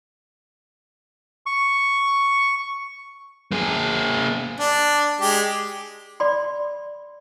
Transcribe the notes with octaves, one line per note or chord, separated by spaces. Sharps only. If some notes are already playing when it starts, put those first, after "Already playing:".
C#6
A#3 G#4
D4
G#3 G4
D5 B5 C6